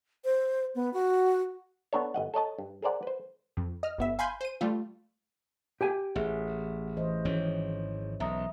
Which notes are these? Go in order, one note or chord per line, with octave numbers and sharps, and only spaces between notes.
C5
B3
F#4
B3 D4 A4 C#5
G1 D#5 F#5
A4 C#5 D#5 A5
G2
G#4 A#4 C5 D5 F#5
B4 C5
F2
D#5 F6
G1 B3 E5
F5 G#5 B5 C6 G6
C5 D#7
G3 A3 F4
G4 G5 G#5
A1 G#4 E5 F#5
E3 C5 D#5
G#1 E3 F3 C#4 C#5
B1 E5 A#5 D#6